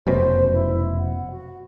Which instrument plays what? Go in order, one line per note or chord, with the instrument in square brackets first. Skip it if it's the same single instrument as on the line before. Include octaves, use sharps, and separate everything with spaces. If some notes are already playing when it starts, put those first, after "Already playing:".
[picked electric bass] F1 F#2 B2 [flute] C5
[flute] E4
F#5
F#4